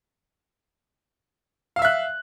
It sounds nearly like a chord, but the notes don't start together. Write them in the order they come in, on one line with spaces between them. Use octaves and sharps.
F5 E6 E5 F#6